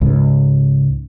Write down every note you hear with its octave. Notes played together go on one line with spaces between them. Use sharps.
C#2 G#2 C#3